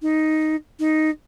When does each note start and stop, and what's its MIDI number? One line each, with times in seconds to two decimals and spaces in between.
0.02 0.56 63
0.80 1.10 63